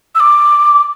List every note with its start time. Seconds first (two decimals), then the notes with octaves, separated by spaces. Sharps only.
0.15 E6
0.20 D6